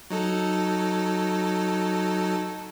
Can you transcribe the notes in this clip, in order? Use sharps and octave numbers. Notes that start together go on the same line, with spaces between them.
F#3 D#4 A4